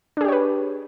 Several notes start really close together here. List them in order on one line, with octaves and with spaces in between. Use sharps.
D4 G#4 G4 C#5 B4